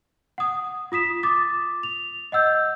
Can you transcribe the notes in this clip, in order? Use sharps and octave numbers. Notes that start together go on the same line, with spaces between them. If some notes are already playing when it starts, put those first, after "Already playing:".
F#5 D#6
F4 D#6 B6 E7
D6 D#6 A6
F7
D#5 F#5 E6 G6